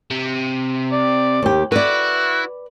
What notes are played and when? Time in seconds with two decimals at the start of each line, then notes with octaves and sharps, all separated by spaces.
0.11 C3
0.92 D5
1.43 D#2 G4
1.72 E4 F#4 B4 D5